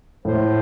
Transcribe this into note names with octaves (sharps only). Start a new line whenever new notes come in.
A2 C5